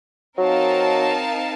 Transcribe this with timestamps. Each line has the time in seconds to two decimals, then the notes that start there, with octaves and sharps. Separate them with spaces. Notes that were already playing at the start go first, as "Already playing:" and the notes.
0.38 F#3 C4 D#4 A#4 F5 A5